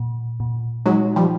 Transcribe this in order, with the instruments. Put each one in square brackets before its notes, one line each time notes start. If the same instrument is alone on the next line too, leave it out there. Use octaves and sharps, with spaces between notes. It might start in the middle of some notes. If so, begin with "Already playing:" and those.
Already playing: [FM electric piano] A#2
A#2
[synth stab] F#3 G#3 [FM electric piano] D#4
[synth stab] F3 G3